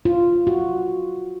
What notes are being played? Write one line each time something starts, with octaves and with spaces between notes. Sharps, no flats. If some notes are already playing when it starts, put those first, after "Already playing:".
F4
F#4